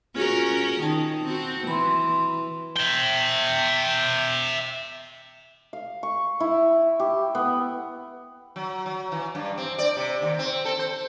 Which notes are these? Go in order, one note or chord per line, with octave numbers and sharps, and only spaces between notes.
C#4 F4 F#4 G#4 A#4
D#3 G5 A5
C4 F#4
E3 B5 C6
E5 G5
F5
C#6
E4
G4
B3
F#3
F#3
E3
G2
C4
D5
C3
D#2
C4
A4
C5